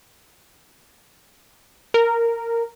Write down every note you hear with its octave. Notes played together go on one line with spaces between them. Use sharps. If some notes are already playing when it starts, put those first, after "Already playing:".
A#4